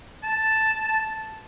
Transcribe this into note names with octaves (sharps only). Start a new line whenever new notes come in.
A5